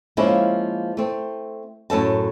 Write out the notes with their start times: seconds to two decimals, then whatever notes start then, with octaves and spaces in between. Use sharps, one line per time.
0.17 F3 G#3 A#3 C#4 E4
0.97 A3 C4
1.90 F#2 A2 A4 A5